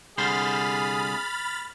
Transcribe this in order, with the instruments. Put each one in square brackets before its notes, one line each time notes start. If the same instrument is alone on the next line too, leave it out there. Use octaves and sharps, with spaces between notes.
[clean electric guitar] C2 D3 C5 [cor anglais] G#4 [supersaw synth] B5 F6 A6